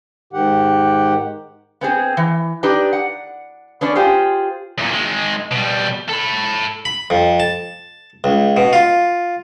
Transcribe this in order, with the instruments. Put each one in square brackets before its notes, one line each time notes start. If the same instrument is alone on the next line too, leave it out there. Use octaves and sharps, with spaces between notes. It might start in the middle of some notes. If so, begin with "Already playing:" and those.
[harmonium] G#2 D#3 G4 F#5
[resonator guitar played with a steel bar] B3 C4 G#4
E3
D4 D#4 G4 B4
F#5
B3 C#4 D4
F4 G4 G#4 C5
[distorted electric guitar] E2 A#2
D#3 G#3
B2 G3
A4 B5
[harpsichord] B5
F2
A5
C#2
B2
F4